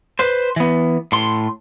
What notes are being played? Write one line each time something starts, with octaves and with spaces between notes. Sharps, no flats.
B4 C5
E3 B3
A2 C6